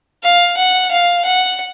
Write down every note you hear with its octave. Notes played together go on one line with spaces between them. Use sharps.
F5
F#5
F5
F#5